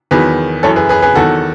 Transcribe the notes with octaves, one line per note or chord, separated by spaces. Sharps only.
E2 D#3 F#3 G#4 B4
F#2 E3 A4 C#5
G#4 B4
G#4 B4
G#4 B4
E2 D#3 F#3 F#4 A4